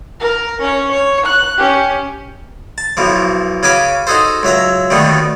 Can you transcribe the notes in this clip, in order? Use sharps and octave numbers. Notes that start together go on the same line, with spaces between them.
A#4
C#4 C#5
C#5
F#6
C#4 G4
A5
B1 B2 E3 F3
C#3 C#4 F#4 G#5 B5 D6
D#4 F#4 G#4 A4 C5
C#2 F#3 E5 A#5
D#2 B2 D3 D#3 A3 B3